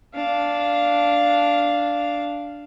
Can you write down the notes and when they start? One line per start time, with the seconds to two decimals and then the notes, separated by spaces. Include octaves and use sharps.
0.15 D4 F5